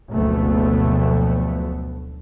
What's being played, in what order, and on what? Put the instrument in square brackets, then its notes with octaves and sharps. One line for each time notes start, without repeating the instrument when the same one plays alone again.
[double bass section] F#1 D2 B2 F3 A3 B3